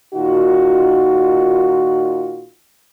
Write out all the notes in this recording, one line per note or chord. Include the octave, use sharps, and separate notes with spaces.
A#2 D#3 D#4 F4 F#4